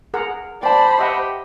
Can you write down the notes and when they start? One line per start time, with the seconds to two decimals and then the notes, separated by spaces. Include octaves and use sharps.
0.14 G#4 A#4 F#5
0.63 C5 D5 G5 A5 B5
0.99 G4 D#5 E5 F#5